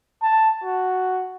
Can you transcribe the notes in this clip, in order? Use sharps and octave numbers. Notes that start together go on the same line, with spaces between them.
A5
F#4